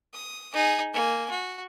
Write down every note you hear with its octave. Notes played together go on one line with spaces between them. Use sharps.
D#6
D#4 G#4
A#3 G#5
F#4